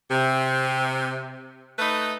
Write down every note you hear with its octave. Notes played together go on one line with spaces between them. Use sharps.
C3
A3 D#4 B4